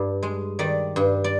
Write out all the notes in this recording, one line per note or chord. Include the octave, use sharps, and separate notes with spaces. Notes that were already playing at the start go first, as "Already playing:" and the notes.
Already playing: G2 D5
G#3
D#3 D5
G2
D5